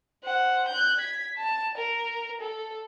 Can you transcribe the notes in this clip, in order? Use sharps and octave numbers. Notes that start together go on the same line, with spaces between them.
C5 F#5
F#6 G6
G#6 B6
A5
A#4
A4